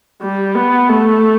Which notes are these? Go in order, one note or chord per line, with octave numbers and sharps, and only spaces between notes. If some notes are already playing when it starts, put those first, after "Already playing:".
G3
B3
A3